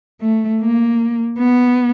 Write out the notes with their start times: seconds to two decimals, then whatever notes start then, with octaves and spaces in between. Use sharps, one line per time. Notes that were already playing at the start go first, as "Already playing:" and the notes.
0.21 A3
0.61 A#3
1.39 B3